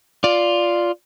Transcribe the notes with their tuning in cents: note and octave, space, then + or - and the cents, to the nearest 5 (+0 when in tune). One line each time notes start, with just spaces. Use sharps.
F4 +0 D5 +0